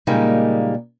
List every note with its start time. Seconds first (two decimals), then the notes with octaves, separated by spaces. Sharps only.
0.07 A#2 C#3 G3 G#3 A#3 D#4